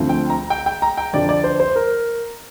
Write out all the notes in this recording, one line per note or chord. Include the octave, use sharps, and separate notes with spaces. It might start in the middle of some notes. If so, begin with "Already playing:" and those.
Already playing: D2 D3 F3 C4 F4
G5
A#5
G5
G5
A#5
G5
F2 D3 F3 D4 F4 D5
D5
C5
C5
A#4